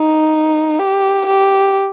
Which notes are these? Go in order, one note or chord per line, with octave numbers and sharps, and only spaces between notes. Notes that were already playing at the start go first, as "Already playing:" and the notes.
Already playing: D#4
G4
G4